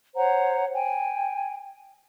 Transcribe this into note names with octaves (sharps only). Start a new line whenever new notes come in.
C5 C#5 F#5 A#5
G5 G#5